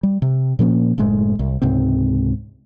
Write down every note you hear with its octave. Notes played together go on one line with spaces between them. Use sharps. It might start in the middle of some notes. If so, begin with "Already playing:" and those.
G3
C3
A#2 F3 A#3 C#4
F#1 A2 G#3 A3
C2
C#2 G#2 C3 C4